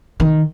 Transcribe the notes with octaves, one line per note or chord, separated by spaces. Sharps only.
D#3